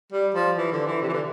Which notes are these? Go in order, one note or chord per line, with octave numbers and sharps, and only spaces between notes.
G3
F3
E3
D3
E3
C3
E3
D3